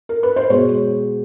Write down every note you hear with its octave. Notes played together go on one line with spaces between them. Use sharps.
A#4
B4
C5
B2 G#3 C#5